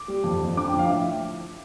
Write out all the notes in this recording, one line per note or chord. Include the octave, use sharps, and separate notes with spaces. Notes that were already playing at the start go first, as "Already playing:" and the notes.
Already playing: D6
G3
F2
F2
D3 D6
G5
F3
F5
A2 E5